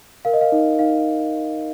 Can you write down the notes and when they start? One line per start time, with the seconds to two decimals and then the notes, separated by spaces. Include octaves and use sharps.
0.25 A#4 F5
0.33 D#5
0.41 F5
0.52 D#4
0.79 D#4 F5